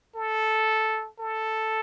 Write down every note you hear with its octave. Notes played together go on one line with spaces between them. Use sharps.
A4
A4